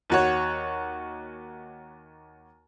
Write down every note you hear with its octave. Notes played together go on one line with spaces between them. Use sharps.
D#2 F#4 C#5